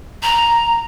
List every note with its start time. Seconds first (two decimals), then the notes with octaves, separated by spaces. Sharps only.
0.23 A#5